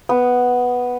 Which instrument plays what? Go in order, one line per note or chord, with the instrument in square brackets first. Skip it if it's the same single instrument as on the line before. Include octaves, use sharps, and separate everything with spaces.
[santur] B3